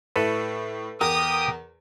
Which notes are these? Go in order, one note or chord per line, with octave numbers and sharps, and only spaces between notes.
A2 E4 A4 B4
E2 G4 A#4 D#6